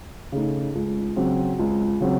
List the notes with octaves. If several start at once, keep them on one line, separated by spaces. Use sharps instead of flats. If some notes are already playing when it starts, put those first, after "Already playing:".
C#3 A3 D#4
C#2
C#3 F#3 C4
C#2
C#3 F#3 C4